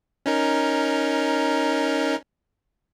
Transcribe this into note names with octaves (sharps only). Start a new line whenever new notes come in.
C#4 D#4 A#4